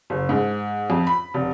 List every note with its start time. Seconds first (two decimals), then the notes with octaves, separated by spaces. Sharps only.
0.10 F#1
0.29 G#2
0.90 F2
1.07 B5
1.34 F1